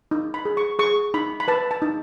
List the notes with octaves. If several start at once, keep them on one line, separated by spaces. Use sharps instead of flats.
D#4
B5
G#4
C#6
G#4 C#6
D#4 B5
B5
B4 A5
A5
D#4